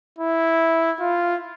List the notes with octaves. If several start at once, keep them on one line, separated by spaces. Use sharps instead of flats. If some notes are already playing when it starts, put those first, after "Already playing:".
E4
F4